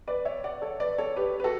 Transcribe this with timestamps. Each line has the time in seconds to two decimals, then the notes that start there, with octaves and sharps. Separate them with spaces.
0.08 B4 D5
0.25 C#5 E5
0.44 D5 F#5
0.62 A4 C#5
0.80 B4 D5
0.98 A4 C#5
1.16 G4 B4
1.40 B4
1.44 F#4 A4